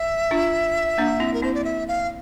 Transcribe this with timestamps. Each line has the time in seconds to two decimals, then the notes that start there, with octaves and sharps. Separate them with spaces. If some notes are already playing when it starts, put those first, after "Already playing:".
Already playing: E5
0.31 D4 F4
0.98 A#3 D4
1.20 C4 E4
1.34 A#4
1.42 C4 E4 C5
1.54 D5
1.64 E5
1.88 F5